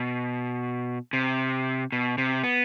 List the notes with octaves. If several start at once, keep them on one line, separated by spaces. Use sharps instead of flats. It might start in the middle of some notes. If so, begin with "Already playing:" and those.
Already playing: B2
C3
B2
C3
B3